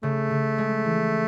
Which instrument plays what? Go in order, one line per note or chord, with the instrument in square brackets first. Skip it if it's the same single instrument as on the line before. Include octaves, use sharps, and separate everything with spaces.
[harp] C#3 [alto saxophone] A3
[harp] C#3
G#3
E3